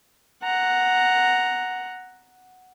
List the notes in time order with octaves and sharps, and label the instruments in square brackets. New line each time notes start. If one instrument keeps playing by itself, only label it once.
[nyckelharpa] F#5 A#5